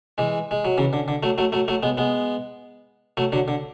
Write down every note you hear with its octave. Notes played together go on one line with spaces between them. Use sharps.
E3 G#3
G#3
F#3
C#3 E3
D3
D3
F#3 A3
F#3 A3
F#3 A3
F#3 A3
G#3 B3
G#3 B3
F#3 A3
D3 F#3
D3